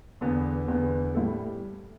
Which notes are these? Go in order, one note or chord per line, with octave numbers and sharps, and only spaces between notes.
E2 D3 B3
E2 D3 B3
A2 G3 E4 A4